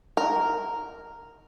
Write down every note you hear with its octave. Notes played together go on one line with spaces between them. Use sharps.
A#4